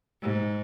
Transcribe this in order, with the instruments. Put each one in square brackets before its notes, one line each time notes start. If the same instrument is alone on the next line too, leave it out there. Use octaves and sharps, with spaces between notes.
[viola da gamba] G#2